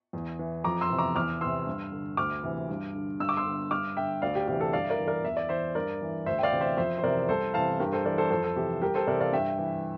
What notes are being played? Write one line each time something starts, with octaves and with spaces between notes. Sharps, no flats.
E2
E3
F2 A#5 D6
C6 E6
C3 E3
A#5 D6
E2 D6 F6
C3 E3 C6 E6
G2
D3
D2 D6 F6
C3 E3
G2
D3
G2 E6
D6
C6 E6
D3
G2 D6 F6
D3 E5 G5
D2 D5 F5
G4
C3 E3 G4
A4
G2 D5 F5
E5
A#4 D5
E3
A#4 D5
E2 E5
D5
E3 C5 E5
G2 A#4 D5
E3
D2 C5 E5
G5
D5 F5
C3 E3
C5 E5
F2 C5 E5
C5
C3 E3 A#4 D5
C2 A4 C5
C3 E3 F5 A5
G2 G4 A#4
A4 C5
E3 A#4 D5
A4 C5
F2 A4 C5
A4
C3 E3 G4
C2 G4 A#4
A4 C5
C3 E3 A#4 D5
D5 F5
G2 E5 G5
E3